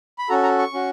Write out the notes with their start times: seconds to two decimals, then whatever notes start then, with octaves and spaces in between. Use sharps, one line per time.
0.18 B5
0.29 C#4 F#4 A4 A#5
0.44 A#5
0.59 C#6
0.73 C#4 F#4